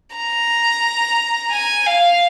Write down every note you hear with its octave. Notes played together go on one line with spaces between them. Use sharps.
A#5
G#5
F5